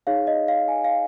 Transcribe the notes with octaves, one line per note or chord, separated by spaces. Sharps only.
D#4 G#4 C#5 F5
D#5
F5
G#5
F5